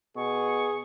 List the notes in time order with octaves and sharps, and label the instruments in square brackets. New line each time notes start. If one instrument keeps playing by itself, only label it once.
[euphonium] B2 [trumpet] G#4 [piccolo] C#6